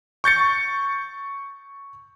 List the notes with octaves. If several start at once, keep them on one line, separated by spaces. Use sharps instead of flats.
C#6 G6 A6 C#7